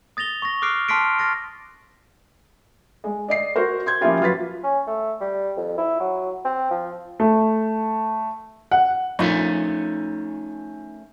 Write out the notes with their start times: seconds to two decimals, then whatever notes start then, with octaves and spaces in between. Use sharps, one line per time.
0.17 D#6 A6 A#6 F7 G7
0.42 C#6 A#6
0.62 D6 D#6 F6 F#6 C7 D7
0.89 A5 C6 F6 B6 C7 D7
1.19 F6 A6 A#6 D7
3.04 G#3
3.28 D5 D#5 C7
3.56 F#4 A#4 C5
3.86 C6 G6 G#6
4.01 F3 A#3 C#4 E4 F4 G4
4.21 F#3 F4 B4 A6 B6
4.63 C#4
4.87 A3
5.21 G3
5.57 F2
5.78 E4
6.00 F#3
6.45 C4
6.71 F3
7.20 A3
8.71 F#5
9.19 A#1 A3 C#4 D#4 F4